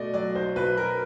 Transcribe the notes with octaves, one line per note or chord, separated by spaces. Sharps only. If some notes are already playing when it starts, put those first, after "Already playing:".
Already playing: B2 A3 D5 D#5
F#3 D5
B1 C5
B1 B4
B1 A#4